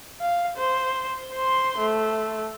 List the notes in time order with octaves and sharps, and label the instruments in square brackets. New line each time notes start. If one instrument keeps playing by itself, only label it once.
[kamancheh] F5
C5
C5 C6
A3